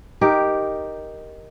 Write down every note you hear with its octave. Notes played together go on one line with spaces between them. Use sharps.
D#4 G4 A#4